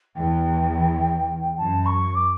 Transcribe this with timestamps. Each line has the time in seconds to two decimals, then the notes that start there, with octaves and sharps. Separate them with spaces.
0.16 E2 G5
1.58 F#2 A5
1.86 C#6
2.15 D6